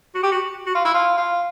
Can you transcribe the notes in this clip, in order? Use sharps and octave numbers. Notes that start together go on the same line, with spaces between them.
F#4
G4
F#4
F#4
F4
E4
F4
F4